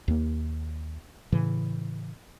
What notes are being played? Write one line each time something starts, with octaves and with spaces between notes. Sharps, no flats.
D#2 A#3
A2 C#3 E3